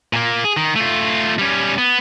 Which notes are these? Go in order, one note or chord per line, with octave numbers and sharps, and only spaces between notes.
A#2 A#3
G#4
D#3
A3 F4
G3 C#4
B3